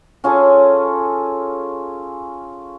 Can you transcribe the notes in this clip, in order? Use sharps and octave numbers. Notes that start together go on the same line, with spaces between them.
C#4 F4 G#4 A4